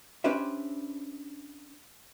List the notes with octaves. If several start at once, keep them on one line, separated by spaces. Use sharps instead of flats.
C#4 D4 G4 B4 C5 E5